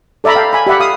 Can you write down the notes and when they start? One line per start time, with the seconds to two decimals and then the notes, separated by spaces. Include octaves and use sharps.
0.24 A4 D5 E5 A#5 B5
0.35 F5 G5 A5
0.53 G#5 B5
0.67 G4 D5 E5 F#5 B5
0.80 F5 D#6